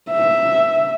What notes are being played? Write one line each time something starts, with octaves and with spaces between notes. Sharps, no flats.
E5